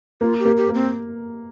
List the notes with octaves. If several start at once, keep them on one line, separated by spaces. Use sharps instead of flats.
A#3 F4
G4
A#3
G4
A#3
C4